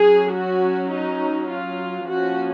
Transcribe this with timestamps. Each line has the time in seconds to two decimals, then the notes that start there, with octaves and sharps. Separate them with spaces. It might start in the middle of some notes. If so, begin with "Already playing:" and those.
Already playing: F#3 C#4 G#4
0.32 F#4
0.90 D#4
1.50 F4
2.09 F3 A#3 C#4 F#4